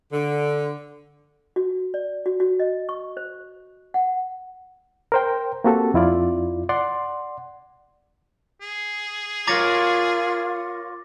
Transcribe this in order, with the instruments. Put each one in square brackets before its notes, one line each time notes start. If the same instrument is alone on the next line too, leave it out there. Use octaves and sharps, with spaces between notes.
[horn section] D3
[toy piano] F#4
D5
F#4
F#4
D#5
C#6
C5
F#5
[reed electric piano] A#4 C5 G5
A#3 C4 F#4 G4 A4
F2 E4 F4 D5
D5 F#5 C6
[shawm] G#4
[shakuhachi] F4 [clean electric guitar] A#4 C#5 A#5 [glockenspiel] D6 A6 A#6